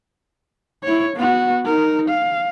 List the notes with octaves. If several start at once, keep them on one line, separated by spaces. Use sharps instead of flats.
E4 C#5
B3 F#4
D#4 A#4
F5